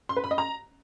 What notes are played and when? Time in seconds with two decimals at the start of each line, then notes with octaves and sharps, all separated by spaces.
0.09 C6
0.17 B4
0.24 B5
0.31 D#5
0.38 A#5